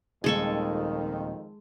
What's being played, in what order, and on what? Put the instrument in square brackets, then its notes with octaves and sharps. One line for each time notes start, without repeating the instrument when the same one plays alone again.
[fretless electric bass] D#1 [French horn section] F2 D#3 [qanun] G#3 A4 C#6